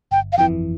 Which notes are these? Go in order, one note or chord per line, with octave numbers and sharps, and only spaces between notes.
G1 G5
F5
F2 E3 G5